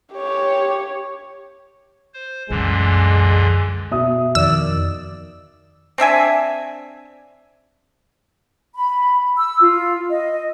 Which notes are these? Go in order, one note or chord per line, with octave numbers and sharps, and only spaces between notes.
G4 C#5
C5
C2 F#2 A#2 D3 E3 G#3
B2 E5 D#6
F2 D#3 D5 E6
C4 D4 E5 G#5
B5
E6
F4
D#5